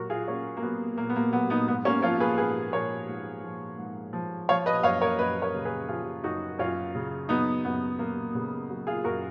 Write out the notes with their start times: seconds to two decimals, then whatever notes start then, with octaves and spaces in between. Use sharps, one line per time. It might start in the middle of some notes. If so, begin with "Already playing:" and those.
Already playing: A#2 F#3 F#4 A#4
0.10 F4 G#4
0.27 A#2 A#3 C#4
0.57 A#3
0.62 F#3 B3
0.97 A#2 A#3
1.10 B3
1.16 A#3
1.33 F#3 B3
1.50 B3 D#4
1.68 G#2 B3
1.85 A#3 C#4
2.02 F3 C#4 F4
2.20 G#4 B4
2.38 G#2 G#4 B4
2.73 F3 A#4 C#5
3.08 G#2
3.43 F3
3.78 G#2
4.13 F3
4.49 F3 C#5 F5
4.66 B4 D#5
4.83 F#2 C#5 F5
5.02 A#4 C#5
5.19 F#2 B4 D#5
5.42 A#4 C#5
5.54 C#3
5.65 G#4 B4
5.88 F3 F4 G#4
6.24 F#2 D#4 F#4
6.59 F#2 C#4 F4
6.95 C#3
7.29 F#3 B3 D#4
7.65 F#2 B3
7.99 F#2 A#3
8.34 C#3 B3
8.70 F#3
8.87 F4 G#4
9.04 F#2 F#4 A#4